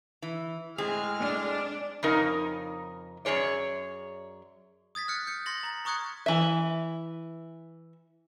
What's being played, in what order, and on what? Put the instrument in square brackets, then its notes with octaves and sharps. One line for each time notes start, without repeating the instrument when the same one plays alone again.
[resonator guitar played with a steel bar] E3
[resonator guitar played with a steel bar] A2 C4 G#4 [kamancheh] G#3 F6
[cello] D4
[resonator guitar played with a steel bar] F2 C#3 D#4 A#4
F#2 D#3 G#4 C#5 D5
[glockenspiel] D#6 G#6 A6 B6
F6 F#6 C#7
G6 C#7
C6 A6 A#6 F#7
A#5 A6
A#5 C#6 D#6 F#6 G#6 C#7
[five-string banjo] E3 E5